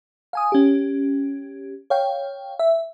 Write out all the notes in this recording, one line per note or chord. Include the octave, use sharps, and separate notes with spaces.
F5 G#5 D#6
C#4 G4
C#5 F5 G5
E5